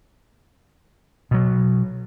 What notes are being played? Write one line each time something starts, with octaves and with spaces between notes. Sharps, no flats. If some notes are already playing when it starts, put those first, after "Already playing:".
B2 F#3